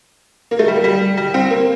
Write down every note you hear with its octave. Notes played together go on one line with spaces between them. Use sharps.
A#3
A3
G3
A#3
G3
G3
C4
A#3